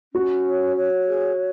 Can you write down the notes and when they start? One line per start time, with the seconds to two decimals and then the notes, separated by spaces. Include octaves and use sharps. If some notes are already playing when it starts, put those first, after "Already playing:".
0.14 C#4 F#4
0.44 C#5
0.76 C#5
1.07 G#4